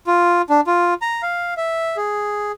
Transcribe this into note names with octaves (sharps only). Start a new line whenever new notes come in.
F4
D4
F4
A#5
F5
E5
G#4